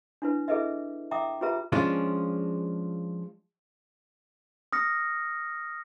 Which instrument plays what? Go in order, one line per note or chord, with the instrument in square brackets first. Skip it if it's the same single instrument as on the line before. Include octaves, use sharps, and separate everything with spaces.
[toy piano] D4 E4 B4
E4 G#4 A4 B4 D#5 E5
E5 G5 A#5 D6 D#6
F4 G4 G#4 B4 E5 A#5
[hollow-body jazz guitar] F3 G#3 C#4 D4 F4
[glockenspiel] D#6 F6 A#6 C#7